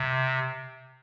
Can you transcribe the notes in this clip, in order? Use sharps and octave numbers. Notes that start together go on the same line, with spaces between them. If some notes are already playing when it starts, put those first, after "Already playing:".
Already playing: C3